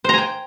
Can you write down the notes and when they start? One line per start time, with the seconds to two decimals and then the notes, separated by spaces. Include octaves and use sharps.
0.04 C5
0.09 A#5
0.13 G#5
0.18 G5